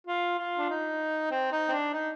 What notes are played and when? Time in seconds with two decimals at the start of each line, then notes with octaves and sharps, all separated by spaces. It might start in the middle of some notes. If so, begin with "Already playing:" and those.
0.07 F4
0.38 F4
0.58 D4
0.70 D#4
1.32 C4
1.52 D#4
1.69 C4
1.72 D4
1.94 D#4